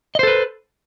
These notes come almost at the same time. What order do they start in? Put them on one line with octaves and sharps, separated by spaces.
D#5 C5 A4 B4